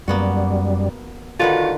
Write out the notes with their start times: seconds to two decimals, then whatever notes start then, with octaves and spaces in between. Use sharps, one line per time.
0.08 F#2 G3 A#3 B3 F#4
1.40 D3 D#3 F4 F#4 B4